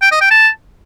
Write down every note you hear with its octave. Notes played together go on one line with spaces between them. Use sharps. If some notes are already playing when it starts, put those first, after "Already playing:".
G5
D#5
G5
A5